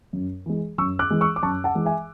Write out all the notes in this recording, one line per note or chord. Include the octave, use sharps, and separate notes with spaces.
F#2
E3 G#3
F#2 C#6 E6
D6 F#6
E3 G#3
C#6 E6
D6
F#2 A5 C#6
F#5 A5
E3 G#3
E5 G#5